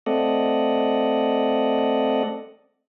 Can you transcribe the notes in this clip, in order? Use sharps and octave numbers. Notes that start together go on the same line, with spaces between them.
A3 C4 A4 D5 D#5 F#5